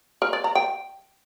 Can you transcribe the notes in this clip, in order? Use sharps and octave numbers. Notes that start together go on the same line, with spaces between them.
A#4
D5
A#5
G5